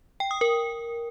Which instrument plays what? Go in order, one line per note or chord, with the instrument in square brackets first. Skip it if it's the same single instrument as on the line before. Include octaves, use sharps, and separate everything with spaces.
[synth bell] G5
D#6
A#4